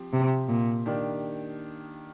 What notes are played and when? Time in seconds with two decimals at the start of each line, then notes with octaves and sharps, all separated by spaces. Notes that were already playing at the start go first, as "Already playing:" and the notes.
Already playing: F3 C4 G4
0.13 C3
0.49 A#2
0.86 D#3 A#3 D4 G4 D5